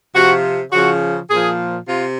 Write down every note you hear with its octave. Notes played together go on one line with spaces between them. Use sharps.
C3 F3 F#4
C#3 F3 F#4
A#2 F3 G#4
C3 F4